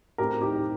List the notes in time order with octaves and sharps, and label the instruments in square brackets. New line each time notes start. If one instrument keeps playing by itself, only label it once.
[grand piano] A2 A3 C4 G4 A#4
D#4 G4